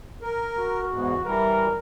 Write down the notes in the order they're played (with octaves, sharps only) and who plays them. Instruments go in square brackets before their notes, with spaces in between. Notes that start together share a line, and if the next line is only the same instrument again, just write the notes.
[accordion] A#4
[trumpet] F#4
[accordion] E2 G#2
[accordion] E3 G3 [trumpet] A#4